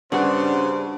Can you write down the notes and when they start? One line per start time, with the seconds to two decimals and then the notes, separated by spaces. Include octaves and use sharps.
0.12 G2 C#3 D4 F#4 C5 F#5